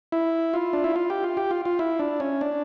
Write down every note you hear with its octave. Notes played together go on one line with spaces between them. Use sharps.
E4
F4
D4
E4
F4
G4
F4
G4
F4
F4
E4
D4
C#4
D4